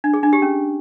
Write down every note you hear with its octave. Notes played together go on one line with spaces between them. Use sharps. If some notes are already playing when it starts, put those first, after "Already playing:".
D4
G#4
D4
G4
C#4